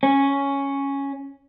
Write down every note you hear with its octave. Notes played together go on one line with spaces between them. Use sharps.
C#4